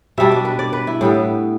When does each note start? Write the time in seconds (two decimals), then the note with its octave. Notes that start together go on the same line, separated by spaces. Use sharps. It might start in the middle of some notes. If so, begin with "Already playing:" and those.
0.18 B2 G3 D4 E5
0.32 D5
0.45 B4
0.59 D5
0.73 B4
0.87 E4
1.01 A2 G3 B3